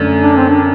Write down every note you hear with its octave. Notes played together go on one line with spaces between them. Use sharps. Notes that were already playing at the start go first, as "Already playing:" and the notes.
Already playing: F#2 D3 A3
D4
C4
D4